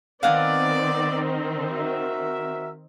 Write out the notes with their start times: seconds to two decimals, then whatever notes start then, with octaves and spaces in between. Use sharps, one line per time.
0.23 D#3 B3 C4 D5 F5 F#5 G#5
1.72 F#4 A#4 E5